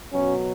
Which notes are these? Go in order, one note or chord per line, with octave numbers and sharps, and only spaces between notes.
B2 F#3 C#4